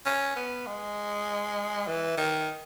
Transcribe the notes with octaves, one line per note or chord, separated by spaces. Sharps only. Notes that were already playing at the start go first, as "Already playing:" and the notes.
C#4
B3
G#3
E3
D#3